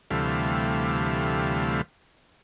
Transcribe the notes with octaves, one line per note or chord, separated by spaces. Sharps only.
D2 C3 E3 G3 A3 F5